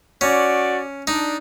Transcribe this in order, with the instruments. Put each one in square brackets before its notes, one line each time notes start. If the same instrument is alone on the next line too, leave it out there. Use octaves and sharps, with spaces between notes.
[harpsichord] C#4 [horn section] F#4 D5
[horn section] D4 [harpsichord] D#4